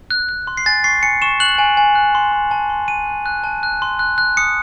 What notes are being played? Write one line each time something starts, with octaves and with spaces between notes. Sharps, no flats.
F#6
F#6
C6
C7
G#5 A6
C#6 C7
G#5 C#7
C#6 E7
F#6 F#7
G#5
G#5
F#6
C6
C6
A5
C6
C6 D#7
F#6
F#6
A5
F#6
C6
F#6
F#6
D#6 C#7